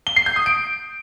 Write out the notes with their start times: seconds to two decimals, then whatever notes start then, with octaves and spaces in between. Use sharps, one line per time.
0.07 G7
0.16 C7
0.26 G6
0.36 D#6
0.46 D7